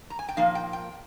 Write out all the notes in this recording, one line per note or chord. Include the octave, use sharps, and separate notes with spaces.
A#5
G#5
G5
A#2 F3 A#3 D#4 F5
G5
G5